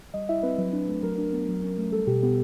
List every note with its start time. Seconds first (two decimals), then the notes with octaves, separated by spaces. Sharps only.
0.14 G3 D#5
0.29 E4 E5
0.43 C4 B4
0.58 F#3 B4
0.73 D4
0.88 A3
1.03 F#3 A#4
1.18 D4
1.32 B3
1.48 F#3
1.63 C#4
1.78 A3
1.92 G3 A4
2.07 B2 G4
2.23 B3 G4